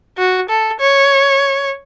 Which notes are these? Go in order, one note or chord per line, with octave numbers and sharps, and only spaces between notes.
F#4
A4
C#5